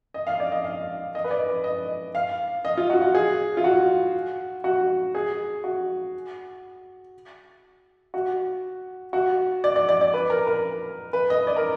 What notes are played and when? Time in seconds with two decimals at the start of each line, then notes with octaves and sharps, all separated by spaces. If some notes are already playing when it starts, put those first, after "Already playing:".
0.14 D#5
0.27 F5
0.40 D5
0.52 D#5
0.65 F5
1.15 D#5
1.24 B4
1.31 D5
1.48 B4
1.64 D#5
2.15 F5
2.65 D#5
2.77 F4
2.90 F#4
3.02 F#4
3.15 G#4
3.57 F4
3.64 F#4
4.64 F#4
5.15 G#4
5.64 F#4
8.14 F#4
9.13 F#4
9.64 D5
9.76 D5
9.89 D5
10.01 D5
10.14 B4
10.30 A#4
10.47 A#4
11.13 B4
11.30 D#5
11.47 D5
11.56 A#4